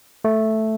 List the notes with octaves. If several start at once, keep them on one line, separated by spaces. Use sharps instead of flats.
A3